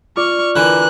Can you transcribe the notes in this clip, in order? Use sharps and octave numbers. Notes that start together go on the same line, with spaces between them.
F4 D5 C#6 F6
D3 E3 A#4 B4 F#6